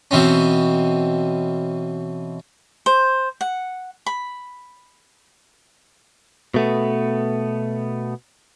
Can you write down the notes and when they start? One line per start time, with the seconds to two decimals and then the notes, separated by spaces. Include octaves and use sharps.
0.11 B2 E3 C4 C#4
2.86 C5
3.41 F#5
4.06 B5
6.54 B2 A3 B3